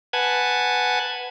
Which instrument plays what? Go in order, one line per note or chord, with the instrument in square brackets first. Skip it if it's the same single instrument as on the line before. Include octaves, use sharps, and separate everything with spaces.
[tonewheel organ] B4 F#5 G#5 A5 G#6